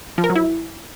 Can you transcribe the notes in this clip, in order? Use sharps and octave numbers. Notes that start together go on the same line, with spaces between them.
F3
A#4
F#3
E4